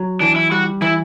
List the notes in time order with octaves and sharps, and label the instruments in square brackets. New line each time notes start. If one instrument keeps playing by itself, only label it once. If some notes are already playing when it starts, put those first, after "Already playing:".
Already playing: [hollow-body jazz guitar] F#3
[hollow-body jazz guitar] E3 [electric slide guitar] D4
[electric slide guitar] E4
[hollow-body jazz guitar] G3 [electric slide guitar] F#4
[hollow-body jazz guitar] E3 [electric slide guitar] E4